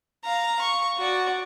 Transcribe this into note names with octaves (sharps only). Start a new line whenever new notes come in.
F5 A#5
C#6
F#4 D5